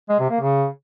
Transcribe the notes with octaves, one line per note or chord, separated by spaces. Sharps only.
G#3
C3
A#3
C#3